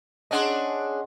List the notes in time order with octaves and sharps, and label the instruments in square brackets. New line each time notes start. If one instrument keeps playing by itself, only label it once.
[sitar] C#4 D4 G#4 [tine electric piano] D#5 F#5 C6